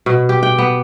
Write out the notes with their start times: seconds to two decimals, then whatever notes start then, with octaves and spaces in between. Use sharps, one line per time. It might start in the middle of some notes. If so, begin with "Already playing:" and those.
0.06 B2
0.29 G4
0.43 G5
0.58 B3